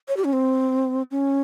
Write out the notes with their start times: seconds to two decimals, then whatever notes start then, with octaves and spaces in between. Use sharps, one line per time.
0.08 C#5
0.17 G4
0.24 C#4
0.33 C4
1.11 C#4